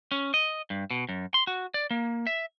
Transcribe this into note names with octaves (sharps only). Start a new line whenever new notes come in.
C#4
D#5
G2
B2
F#2
C6
F#4
D5
A#3
E5